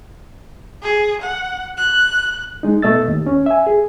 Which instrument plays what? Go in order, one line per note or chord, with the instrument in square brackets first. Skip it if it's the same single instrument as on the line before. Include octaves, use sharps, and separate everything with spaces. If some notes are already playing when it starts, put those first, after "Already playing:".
[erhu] G#4
F#5
F#6
[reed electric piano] G#3 D#4
B2 A3 D#5 E6 A6
D#2
C#4
E5 G#5
G#4